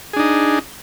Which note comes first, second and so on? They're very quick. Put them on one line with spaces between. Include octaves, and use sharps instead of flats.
G#4 D4 D#4